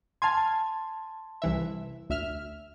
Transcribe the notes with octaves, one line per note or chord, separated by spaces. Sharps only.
F5 G#5 A5 C6 G#6
C2 E3 E5
D2 E5 F6